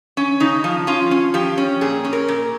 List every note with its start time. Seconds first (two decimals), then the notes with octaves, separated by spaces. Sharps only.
0.17 C#4
0.40 C#3 D#4
0.64 F3
0.87 C#4 F4
1.11 C#4
1.34 F3 G4
1.58 C#4
1.81 A#2 G#4
2.05 C#4
2.13 A#4
2.28 A#2